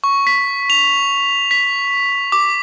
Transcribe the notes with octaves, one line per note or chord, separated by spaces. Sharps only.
C#6
B6
F7
B6
D6